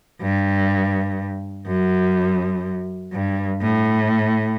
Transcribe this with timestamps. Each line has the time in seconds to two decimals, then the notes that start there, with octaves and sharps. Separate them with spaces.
0.21 G2
1.67 F#2
3.12 G2
3.61 A2